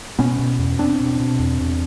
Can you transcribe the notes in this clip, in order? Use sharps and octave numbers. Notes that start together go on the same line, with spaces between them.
B2 B3 C#4
B2
E2
E2 C4 D4
B2
B2
E2
E2